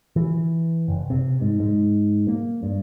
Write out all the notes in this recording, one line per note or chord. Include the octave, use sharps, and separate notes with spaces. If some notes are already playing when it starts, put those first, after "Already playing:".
E3
F#1
C3
G#2
G#2
A#3
G2